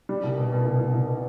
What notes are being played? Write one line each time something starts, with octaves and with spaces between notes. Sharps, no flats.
G3
C2
B2
B2
C2
C2
C2
B2